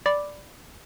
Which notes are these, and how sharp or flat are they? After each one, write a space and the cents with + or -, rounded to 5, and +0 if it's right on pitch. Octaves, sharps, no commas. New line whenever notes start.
D5 +0 B5 +0 D6 +0